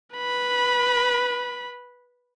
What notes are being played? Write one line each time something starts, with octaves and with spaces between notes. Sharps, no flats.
B4 B5